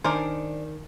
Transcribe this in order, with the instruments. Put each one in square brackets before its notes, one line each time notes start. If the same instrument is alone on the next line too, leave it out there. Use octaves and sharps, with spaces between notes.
[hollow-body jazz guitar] D#3 [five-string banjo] D4 A#4 C5 [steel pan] G#5 D6